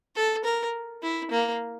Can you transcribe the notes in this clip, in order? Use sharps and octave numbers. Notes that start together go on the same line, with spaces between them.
A4
A#4
E4
A#3